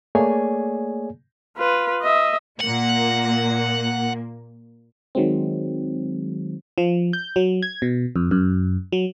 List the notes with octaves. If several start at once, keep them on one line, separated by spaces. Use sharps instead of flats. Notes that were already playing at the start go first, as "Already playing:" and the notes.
A3 A#3 G#4 C#5 D5 G#5
F4 B4
D#5 E5
A#2 A#3 F#5
D#3 F#3 G#3 C4
F3
G6
F#3
G#6
B2
F2
F#2
F#3